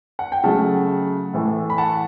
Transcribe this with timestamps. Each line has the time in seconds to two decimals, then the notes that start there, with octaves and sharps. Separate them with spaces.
0.19 F#5
0.32 G5
0.44 C#3 F#3 A3 F#5 A5
1.33 A2 E3 A3
1.70 B5
1.78 F#5 A5